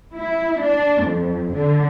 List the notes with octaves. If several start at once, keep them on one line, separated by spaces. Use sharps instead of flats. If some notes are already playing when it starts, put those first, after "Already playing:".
E4
D4
F2
D3